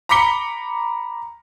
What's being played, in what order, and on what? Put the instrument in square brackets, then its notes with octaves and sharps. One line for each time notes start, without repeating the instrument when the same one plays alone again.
[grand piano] A#5 B5 D6 B6 C#7 G7